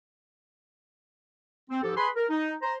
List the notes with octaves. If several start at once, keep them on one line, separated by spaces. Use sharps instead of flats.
C4
G#2 F3 G4 A4
G#4 B4 B5 C6
A#4
D#4
C5 A#5